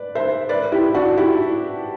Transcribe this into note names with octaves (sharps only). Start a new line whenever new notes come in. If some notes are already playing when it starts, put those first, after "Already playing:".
Already playing: B4 D5
C5 E5
B4 D5
E4 G4
D4 F#4
E4 G4